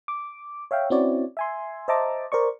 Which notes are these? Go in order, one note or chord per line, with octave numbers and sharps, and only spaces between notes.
D6
C#5 E5 F5 G5
C4 C#4 E4 F#4 C#5 D5
E5 G#5 C6
C5 D#5 E5 A5 A#5 D6
A#4 C5 D5 C#6